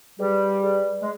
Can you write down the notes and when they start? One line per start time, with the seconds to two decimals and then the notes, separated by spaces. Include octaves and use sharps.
0.19 G3 G#4 B4 D5
0.64 G#4 B4 D5
1.02 G#3